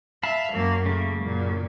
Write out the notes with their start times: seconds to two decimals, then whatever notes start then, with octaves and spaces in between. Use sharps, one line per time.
0.23 E5 F5 A5 B5
0.53 F#2 A#3
0.86 C#3 A3 A#3
1.21 F#2 A#2